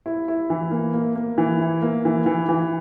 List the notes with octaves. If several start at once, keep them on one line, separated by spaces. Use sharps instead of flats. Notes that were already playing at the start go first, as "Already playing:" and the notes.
E4
E4
E3
A#3
A#3
A#3
E3
E4
A#3
E3
E3
E3